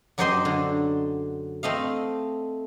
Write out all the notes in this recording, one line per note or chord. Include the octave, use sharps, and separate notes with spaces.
F#2 F#3 G4 C5 D#5 C6
D3
A3 C4 D#5 F5